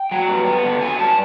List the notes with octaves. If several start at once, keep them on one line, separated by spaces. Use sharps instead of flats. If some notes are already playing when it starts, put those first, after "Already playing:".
Already playing: G5
F#3
G2
B3
D3
F#3 G#5
G2 A5